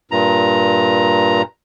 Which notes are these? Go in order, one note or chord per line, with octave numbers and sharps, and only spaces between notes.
G2 A#2 A#5